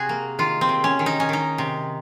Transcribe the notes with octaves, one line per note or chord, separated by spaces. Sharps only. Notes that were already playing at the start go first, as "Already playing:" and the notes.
Already playing: C3 F#4 G#4
A#3
D#3 F4
C4
C3
C#4
D#3
D#4
C#4
D#3 D#4
C3